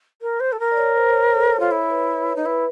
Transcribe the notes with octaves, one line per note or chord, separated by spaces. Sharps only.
A#4
C5
A4
A#4
D5
C#5
C5
C#5
A4
C#5
F4
E4 C#5
B4
D#4
E4 B4